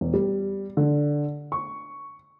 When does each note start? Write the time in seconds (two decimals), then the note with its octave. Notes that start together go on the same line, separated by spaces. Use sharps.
0.01 E1
0.14 G3
0.77 D3
1.52 C#6